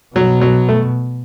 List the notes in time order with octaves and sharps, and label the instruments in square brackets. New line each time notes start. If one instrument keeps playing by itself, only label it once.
[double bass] B2 [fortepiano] F#3
[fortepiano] F#3
A3